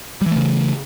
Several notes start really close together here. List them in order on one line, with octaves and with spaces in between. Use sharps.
G3 E3 A3 C#3